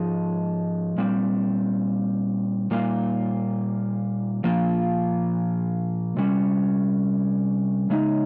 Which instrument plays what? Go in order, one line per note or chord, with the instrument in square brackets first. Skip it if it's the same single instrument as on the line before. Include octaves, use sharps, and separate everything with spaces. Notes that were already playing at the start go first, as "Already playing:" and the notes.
Already playing: [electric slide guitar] G#2 F3 G#3
A#2 G3 C4
A#2 G3 A#3 F4
A#2 F3 A#3 F4
C3 G3 C#4
C#3 G#3 D#4